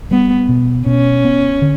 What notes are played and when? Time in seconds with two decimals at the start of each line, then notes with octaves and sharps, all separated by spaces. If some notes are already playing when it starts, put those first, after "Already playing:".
0.11 G3 B3
0.49 B2
0.86 B2 C#4
1.25 B3
1.62 D3